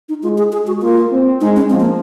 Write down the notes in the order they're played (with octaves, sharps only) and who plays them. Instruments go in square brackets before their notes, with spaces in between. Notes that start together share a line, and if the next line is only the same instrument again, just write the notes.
[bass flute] D#4
[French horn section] G#3 [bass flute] F4
[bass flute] G#4
G#4
F#4
[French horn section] A#3 [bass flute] F4
[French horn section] C4
[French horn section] G#3 [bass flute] D#4
[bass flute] C#4
[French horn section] F3 [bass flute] C4
[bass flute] A#3